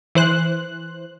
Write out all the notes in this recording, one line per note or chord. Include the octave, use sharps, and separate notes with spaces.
E3 C5 F#6